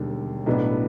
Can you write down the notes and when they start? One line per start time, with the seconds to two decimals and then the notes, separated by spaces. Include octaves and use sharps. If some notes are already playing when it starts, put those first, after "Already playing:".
Already playing: E1 D#2 D3 G3
0.46 B1 A2 F#3 B3 D4